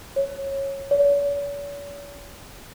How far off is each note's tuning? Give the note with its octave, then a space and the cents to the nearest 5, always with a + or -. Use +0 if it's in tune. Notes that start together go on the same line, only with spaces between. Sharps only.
C#5 -15
C#5 +45